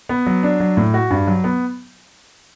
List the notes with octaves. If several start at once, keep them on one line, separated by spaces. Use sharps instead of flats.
B3
F#3
D4
F#3
A2
F#4
G2
F#3
B3